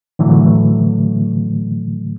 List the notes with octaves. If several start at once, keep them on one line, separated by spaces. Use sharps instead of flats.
A2 D3 E3 F#3 A3